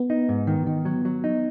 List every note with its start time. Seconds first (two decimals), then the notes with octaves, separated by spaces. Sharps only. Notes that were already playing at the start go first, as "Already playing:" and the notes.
Already playing: B3
0.10 D#4
0.29 G#2
0.47 D#3
0.67 D#3
0.85 F#3
1.05 F#3
1.24 D#4